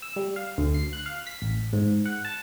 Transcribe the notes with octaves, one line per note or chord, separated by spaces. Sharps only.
E6
G3
F5
D2
C7
F#6
F5
B6
A1
G#2
F#5
A5